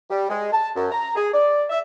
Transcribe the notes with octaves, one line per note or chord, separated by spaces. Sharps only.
G3
G#3
A5
F#2
A#5
G#4
D5
E5